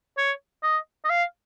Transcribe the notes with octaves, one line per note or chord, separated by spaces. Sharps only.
C#5
D#5
D#5
F5